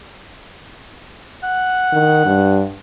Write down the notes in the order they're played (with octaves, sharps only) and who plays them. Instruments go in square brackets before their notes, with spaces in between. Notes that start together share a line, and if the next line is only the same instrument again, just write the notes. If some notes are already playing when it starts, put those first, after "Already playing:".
[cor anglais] F#5
[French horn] D#3
G2